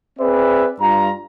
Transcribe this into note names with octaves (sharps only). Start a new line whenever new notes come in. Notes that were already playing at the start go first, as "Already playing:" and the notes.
C4 G#4 B4 D5 E5
G2 F4 A#5